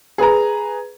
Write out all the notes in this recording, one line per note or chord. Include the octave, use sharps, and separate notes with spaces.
G#4 B4 A#5